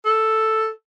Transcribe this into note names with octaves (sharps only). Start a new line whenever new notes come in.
A4